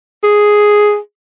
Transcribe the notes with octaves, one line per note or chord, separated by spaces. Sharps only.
G#4